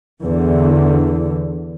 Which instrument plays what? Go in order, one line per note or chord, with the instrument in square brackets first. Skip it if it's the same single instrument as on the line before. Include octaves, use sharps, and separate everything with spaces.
[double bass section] E2 D3